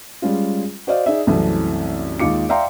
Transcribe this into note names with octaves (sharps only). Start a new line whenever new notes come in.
G3 G#3 C#4 F4
F#4 C5 D5 D#5 F5
D#4 G#4 D5 E5
C2 F#2 E3 A3 C4
D#2 G#3 D#4 F4 D6 C#7
D5 E5 F5 G5 A#5 C6